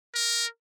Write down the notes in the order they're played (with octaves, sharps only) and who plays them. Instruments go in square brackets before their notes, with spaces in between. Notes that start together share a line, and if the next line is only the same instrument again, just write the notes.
[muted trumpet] A#4